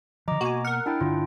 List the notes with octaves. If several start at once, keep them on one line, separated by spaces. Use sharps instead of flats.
D3 F3 D#5 A#5 D6
B2 A#3 F#4 G#5
A#4 F#5 F6
D4 E4 G5
G2 D3 D4 F4